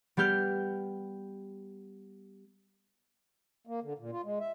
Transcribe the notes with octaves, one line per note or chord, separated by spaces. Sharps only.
G3 B3 G4 F6 G6
A#3
D3
A#2
F4
G#3
E5